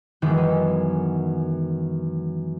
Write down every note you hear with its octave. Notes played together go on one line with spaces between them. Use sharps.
F#2 D#3 E3 G#3 B3